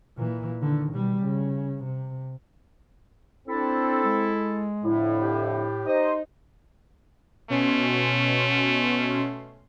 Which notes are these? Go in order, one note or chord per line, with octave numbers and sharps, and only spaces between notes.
A#2 E3
D3 D#3
B2 G3
C#3
C3
C4 D4 E4 A4
G#3
F2 A2 D3 E4
G4
D#4 C5 D#5
B2 A3 C#4 C6